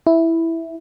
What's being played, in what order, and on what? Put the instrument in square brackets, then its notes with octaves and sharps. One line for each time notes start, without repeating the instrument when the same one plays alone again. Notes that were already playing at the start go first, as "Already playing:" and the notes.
[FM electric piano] E4